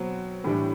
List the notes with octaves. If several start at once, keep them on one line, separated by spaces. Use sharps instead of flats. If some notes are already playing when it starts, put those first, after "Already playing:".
Already playing: B2 F#3 C4
A2 E3 G3 D4